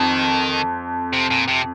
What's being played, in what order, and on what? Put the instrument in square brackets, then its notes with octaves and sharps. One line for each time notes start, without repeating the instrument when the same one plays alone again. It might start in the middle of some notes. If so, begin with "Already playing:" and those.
Already playing: [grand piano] F2 [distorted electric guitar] D#3
[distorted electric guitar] C3
A#2
C3